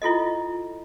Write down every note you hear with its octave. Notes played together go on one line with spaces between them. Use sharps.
E4 F4 A4 D#5